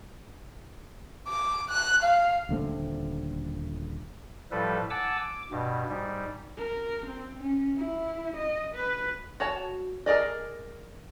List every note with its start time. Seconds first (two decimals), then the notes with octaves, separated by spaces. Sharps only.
1.28 D6
1.70 F#6
2.03 F5
2.49 D#1 D3 A3 C4
4.51 A2 F3 G3 A4 B4
4.90 F#5 G#5 A5 D6 E6
5.20 D6
5.51 G2 B2
5.89 G#2 G3
6.57 A#4
7.06 C4
7.41 C#4
7.77 E4
8.36 D#5
8.74 B4
9.40 F#4 C#5 A5
10.06 G#4 A#4 D5 D#5